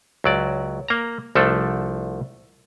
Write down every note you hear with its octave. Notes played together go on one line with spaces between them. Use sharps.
C#2 F#3 D5
A#3 A#5
C2 F3 A3 D4 A4